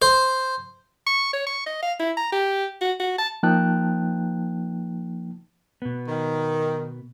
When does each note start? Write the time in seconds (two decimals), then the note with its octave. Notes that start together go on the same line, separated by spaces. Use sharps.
0.02 C5
1.07 C#6
1.33 C#5
1.47 C#6
1.66 D#5
1.83 F5
2.00 E4
2.17 A#5
2.32 G4
2.82 F#4
3.00 F#4
3.18 A5
3.43 F3 A#3 D#4 G5 A5 F#6
5.82 B2 B3
6.08 D#3